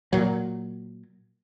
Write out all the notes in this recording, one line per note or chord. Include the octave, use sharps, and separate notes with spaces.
A#2 F#3